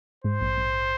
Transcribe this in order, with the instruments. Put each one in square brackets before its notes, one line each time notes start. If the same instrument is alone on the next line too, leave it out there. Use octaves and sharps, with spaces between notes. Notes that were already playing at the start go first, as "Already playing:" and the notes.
[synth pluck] G#2 [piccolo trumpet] C5
[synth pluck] A#1
A#1